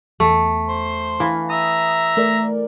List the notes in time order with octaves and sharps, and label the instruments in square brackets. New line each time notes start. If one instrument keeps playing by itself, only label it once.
[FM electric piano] E2 [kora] A3
[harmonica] C5
[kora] E3 [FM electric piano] F5
[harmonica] E5 A#5 [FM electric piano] D#6
[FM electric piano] A3 A#4 D5